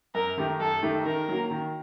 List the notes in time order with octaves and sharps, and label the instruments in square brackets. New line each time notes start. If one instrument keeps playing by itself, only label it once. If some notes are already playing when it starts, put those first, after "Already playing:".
[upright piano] F#2 [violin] A#4
[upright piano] D#3 A3 D#4 G4
[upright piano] F#2 [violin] A4
[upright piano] D#3 A3 D#4 G4
[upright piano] D#3 [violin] A#4
[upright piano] F#3 A#3
D#3